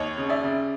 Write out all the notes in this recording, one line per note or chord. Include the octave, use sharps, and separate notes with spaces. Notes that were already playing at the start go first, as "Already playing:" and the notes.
Already playing: D#2 C#5 D#5
C#3
D5 E5
C#3